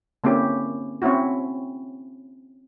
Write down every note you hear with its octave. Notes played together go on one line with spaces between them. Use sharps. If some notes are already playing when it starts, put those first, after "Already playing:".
D3 A#3 C4 C#4 E4 G4
C4 C#4 E4 F#4